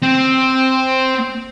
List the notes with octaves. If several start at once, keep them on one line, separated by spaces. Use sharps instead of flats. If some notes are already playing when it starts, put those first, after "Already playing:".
C4